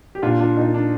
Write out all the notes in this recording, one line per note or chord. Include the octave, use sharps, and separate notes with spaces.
G4
A#2 D4 F4
D4 F4
A#2 D#4
D4